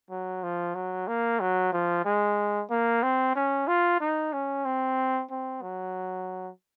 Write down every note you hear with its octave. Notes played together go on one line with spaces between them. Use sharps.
F#3
F3
F#3
A#3
F#3
F3
G#3
A#3
C4
C#4
F4
D#4
C#4
C4
C4
F#3